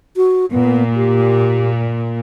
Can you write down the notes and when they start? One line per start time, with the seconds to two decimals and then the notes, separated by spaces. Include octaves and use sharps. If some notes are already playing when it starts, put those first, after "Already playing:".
0.16 F#4
0.51 A#2 B3
0.96 G4